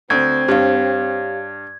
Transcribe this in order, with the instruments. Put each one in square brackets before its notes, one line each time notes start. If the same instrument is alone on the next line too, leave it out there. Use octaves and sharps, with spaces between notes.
[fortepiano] D2 [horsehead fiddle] C4 [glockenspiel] G#6
[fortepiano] G2 [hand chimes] G4 C#5 F5